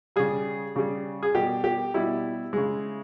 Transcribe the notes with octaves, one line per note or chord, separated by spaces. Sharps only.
C#3 G3 G#4
C#3 G3
G#4
B2 G3 G4
G4
B2 G3 E4
C#3 G#3